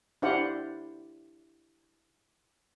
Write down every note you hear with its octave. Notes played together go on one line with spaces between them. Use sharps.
D4 E4 G4 C5 F5 F#5